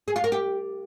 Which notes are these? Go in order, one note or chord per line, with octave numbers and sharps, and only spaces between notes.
G#4
F4
A#4
G4